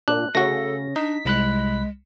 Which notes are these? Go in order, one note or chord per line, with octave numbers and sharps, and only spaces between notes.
A#2 D4 F#6
C#3 A3 F#4 A4 A#6
D4 D#4 B6
C2 G#3 B5 F#6